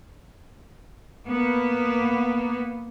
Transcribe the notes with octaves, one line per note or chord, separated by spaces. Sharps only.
A#3 B3